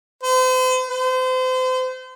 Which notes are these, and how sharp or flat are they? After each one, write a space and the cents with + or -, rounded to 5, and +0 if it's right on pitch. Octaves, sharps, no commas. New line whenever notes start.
C5 -40
C5 -35